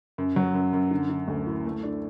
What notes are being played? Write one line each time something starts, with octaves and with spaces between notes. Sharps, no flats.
F#2
F#3
F#2
F#2
D3
D3
D2
E4
A3
D4